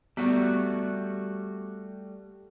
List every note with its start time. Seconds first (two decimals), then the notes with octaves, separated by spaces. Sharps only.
0.17 G3 A3 B3 F#4